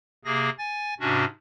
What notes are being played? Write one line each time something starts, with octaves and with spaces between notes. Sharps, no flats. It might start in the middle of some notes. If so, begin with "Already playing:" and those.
C3 A#3 G#4 A#6
G#5 A6
G#2 C3 C#4 D4 F#4